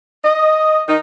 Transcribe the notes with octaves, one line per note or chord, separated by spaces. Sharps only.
D#5
D#3 D#4